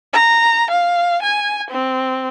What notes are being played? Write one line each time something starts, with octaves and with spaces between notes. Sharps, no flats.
A#5
F5
G#5
C4